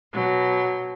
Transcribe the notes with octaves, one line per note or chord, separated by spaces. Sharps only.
B2 F#3